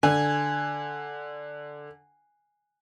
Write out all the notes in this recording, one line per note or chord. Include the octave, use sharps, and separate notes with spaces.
D3 G#5